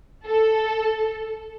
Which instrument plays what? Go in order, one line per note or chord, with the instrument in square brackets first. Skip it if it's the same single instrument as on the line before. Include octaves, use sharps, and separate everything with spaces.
[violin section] A4